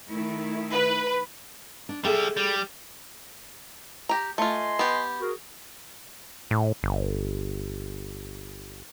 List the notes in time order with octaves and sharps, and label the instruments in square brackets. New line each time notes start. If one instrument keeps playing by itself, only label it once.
[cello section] D#3 A3 E4
[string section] B4
[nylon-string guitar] D4
[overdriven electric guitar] G3 E5 [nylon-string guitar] G#4 A4 G5
[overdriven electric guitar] G3
[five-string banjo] G4 A#5
[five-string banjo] A3 F4 [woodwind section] D#5 G#5 C6
[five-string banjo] B3 G4
[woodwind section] F#4 G#4 A#4
[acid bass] A2
G1